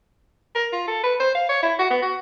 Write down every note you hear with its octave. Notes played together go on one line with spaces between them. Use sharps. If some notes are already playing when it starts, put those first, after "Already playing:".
A#4
F4
A4
B4
C5
F5
C#5
E4
F#4
B3
F#4